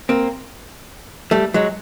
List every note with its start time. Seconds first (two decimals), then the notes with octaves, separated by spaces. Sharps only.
0.09 A#3 C4
1.31 G3 A3
1.54 F#3 G#3